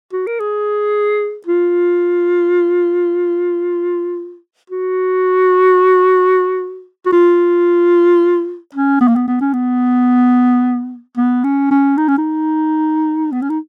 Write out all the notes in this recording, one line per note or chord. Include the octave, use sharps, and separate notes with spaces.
F#4
A#4
G#4
F4
F#4
F#4
F4
C#4
B3
A#3
B3
B3
C#4
B3
B3
C#4
C#4
D#4
C#4
D#4
B3
C#4
D#4